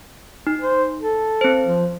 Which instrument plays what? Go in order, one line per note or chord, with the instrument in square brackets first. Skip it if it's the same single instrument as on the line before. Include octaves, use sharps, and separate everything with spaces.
[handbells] D#4
[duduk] C5
A4
[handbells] C4 C5
[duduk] F3